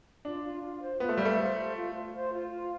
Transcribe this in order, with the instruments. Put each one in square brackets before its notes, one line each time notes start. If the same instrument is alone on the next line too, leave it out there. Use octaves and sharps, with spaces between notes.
[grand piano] D4 [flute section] F4
[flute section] F4
F4
C5
[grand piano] B3 [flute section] F4
[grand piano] A3
[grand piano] G3 [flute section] F5
[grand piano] A3
[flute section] C5
C5
F4
F4
C5
F4
F4